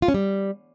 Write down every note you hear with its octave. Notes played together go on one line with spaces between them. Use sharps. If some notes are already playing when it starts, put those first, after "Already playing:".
F4
C#4
G3